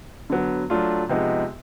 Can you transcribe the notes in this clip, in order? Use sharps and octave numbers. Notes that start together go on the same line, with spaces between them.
D3 F#3 B3
F#3 A3 D4 F4
C3 F3 G#3 B3 D#4